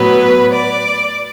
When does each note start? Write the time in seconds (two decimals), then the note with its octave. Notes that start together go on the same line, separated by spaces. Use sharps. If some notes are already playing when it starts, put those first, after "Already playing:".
Already playing: A2 F#3 B3 B4
0.52 D5